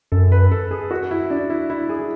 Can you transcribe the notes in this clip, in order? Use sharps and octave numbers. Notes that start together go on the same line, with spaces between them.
F#2 A4
B4
A4
G#4
F#4
E4
D4
E4
E4
G#4